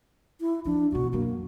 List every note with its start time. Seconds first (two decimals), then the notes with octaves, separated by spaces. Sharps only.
0.41 E4
0.65 F3 D4
0.92 B2 E3 F#4
1.13 F#2 F#3 A#3